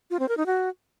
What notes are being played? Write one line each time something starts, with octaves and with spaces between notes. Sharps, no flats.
F4
C4
A#4
D#4
F#4